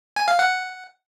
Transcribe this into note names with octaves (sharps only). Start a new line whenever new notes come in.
G#5
F5
F#5